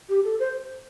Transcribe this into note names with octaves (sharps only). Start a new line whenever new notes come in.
G4
A4
C5